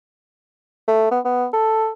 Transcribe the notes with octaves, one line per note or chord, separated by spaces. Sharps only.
A3
B3
B3
A4